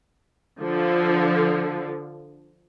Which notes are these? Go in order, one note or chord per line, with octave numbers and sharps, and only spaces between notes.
D3 F3